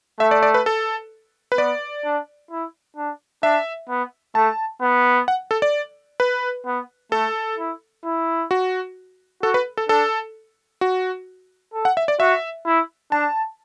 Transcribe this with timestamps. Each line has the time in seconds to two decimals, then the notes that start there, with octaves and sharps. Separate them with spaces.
0.20 A3 E5
0.31 D5
0.43 D5
0.54 B4
0.66 A4
1.52 B4
1.58 B3 D5
2.04 D4
2.51 E4
2.97 D4
3.43 D4 E5
3.89 B3
4.35 A3 A5
4.81 B3
5.28 F#5
5.51 A4
5.62 D5
6.20 B4
6.66 B3
7.12 A3 A4
7.58 E4
8.04 E4
8.51 F#4
9.43 F#4 A4
9.54 B4
9.77 A4
9.89 D4 A4
10.81 F#4
11.73 A4
11.85 F#5
11.97 E5
12.08 D5
12.20 F#4 E5
12.66 E4
13.12 D4 A5